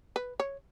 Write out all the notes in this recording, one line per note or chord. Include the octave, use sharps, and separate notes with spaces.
B4
C#5